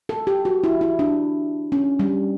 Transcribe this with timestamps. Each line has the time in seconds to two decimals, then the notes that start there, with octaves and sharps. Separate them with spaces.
0.09 A4
0.27 G4
0.45 F#4
0.64 E4
0.81 E4
0.99 D4
1.72 C#4
1.99 G3